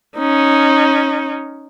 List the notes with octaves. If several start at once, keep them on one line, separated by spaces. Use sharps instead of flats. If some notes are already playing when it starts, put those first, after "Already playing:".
C#4 D#4